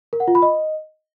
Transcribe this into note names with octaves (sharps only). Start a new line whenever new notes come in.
A#4
F#5
F4
B5
D#5